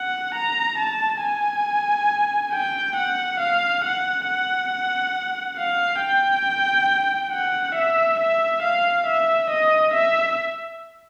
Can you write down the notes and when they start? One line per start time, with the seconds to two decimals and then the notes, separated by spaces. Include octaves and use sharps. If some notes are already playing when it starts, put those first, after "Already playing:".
Already playing: F#5
0.35 A#5
0.79 A5
1.23 G#5
2.53 G5
2.96 F#5
3.40 F5
3.84 F#5
4.27 F#5
5.58 F5
6.01 G5
7.32 F#5
7.75 E5
8.19 E5
8.62 F5
9.06 E5
9.50 D#5
9.94 E5